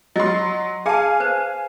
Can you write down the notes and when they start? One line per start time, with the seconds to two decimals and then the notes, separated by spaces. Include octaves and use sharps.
0.16 F#3 D#5 C6
0.86 G#4 F5 G#5 A5
1.20 B4 C5